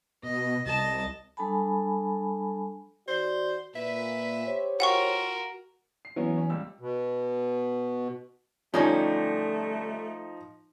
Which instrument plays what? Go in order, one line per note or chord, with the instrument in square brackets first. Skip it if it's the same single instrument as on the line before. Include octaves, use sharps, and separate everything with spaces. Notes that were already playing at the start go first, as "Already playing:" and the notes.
[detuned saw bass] B2 [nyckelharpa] D#5
[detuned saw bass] C2 [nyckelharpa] D#5 A5
[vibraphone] G3 D4 A4 G#5 A5 B5
[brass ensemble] D#3 F#4 D5 [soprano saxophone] C5
[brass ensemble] A#2 [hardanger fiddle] B4 [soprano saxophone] E5
[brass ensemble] G4 C5 C#5
[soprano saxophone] F4 [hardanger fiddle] F#4 A#4 [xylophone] F#5 G5 C#6
[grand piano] C7
[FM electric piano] E3 [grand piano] F#3 B3 C#4
[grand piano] C#4
C#2 G3 E6
[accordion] B2
[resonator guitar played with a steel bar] D3 G3 C#4 [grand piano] F3 D#4 [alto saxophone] A3